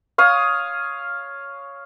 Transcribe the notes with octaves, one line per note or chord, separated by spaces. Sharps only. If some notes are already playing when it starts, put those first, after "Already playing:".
C#5 F5 D#6